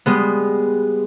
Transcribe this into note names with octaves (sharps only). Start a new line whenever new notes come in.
G3 G#3 B3